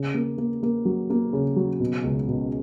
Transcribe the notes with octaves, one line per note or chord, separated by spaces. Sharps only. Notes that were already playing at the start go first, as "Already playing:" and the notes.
Already playing: C#3
A#3
A#3
A#3
F#3
A#3
C#3
F#3
B2
C#2
B2